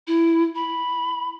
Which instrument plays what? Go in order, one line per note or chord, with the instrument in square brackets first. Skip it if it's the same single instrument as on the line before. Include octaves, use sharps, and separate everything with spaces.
[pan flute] E4
B5